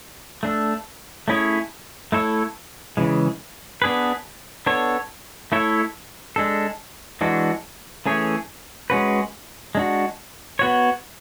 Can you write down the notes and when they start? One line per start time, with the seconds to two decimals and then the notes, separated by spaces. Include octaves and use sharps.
0.43 A3 D4 A4
1.28 A3 C#4 E4 G#4 C#5
2.12 A3 E4 A4 C#5
2.97 C#3 E3 G#3
3.82 B3 D4 G#4 B4
4.66 B3 D4 A4 C#5
5.52 A3 E4 A4 C#5
6.36 G#3 D4 A4
7.21 E3 G#3 D4 F#4
8.06 E3 A3 C#4 G#4 C#5
8.90 G#3 C#4 F#4 B4
9.75 G#3 D4 F#4
10.59 B3 F#4 C#5